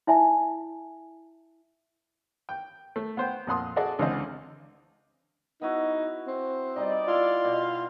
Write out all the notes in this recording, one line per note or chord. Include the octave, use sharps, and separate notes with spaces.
E4 E5 G#5 A5
G5
A3
B3 C5 G5
F2 A#2 F#5 C6 D#6
F#4 G#4 A4 D5 D#5
C#2 D3 E3 C4 C5 D#5
B3 D#4 E4 F#4
C4
G3 D#4 D5 D#5
E4 F4 C6
B2